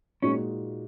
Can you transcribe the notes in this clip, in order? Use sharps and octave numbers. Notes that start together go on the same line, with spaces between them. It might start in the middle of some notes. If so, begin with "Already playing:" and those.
A#2 G#3 C#4 D#4 F#4